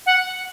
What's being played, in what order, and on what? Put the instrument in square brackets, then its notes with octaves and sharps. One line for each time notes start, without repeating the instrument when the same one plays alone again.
[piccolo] F#5